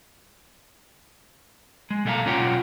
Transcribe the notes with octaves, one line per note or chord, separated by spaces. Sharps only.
G#3
B1 G#3 A4 E5 F5 A#5
B1 C#4 F4 C#5 F#5 G5